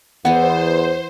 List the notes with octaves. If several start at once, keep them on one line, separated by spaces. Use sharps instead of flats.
E2 E3 B3 C5 F#5